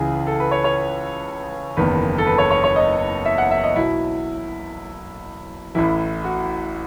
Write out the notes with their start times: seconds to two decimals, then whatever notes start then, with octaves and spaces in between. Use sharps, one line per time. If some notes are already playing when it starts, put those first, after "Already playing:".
Already playing: C#2 C#3 E3 G#4
0.27 A4
0.40 B4
0.51 C#5
0.64 C#5
1.77 F#1 E2 D#3 B4
2.18 A4
2.26 B4
2.38 C#5
2.51 C#5
2.64 C#5
2.76 D#5
3.25 E5
3.38 F#5
3.51 E5
3.64 D#5
3.75 B1 B2 E4
5.75 A1 A2 E3 E4
6.24 F#4